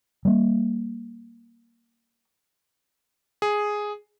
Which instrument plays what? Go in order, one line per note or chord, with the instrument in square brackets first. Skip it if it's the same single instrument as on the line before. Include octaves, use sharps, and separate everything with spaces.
[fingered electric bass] G3 A#3
[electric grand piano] G#4